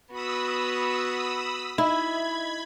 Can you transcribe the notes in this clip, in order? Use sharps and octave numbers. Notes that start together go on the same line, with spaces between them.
B3 F#4 B5 D#6 E6
D#4 E4 E5 B5 G#6